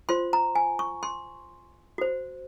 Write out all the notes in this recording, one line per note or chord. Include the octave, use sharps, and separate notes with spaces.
F4 C5 C6
A#5
G#5
C#6
C6
F#4 C5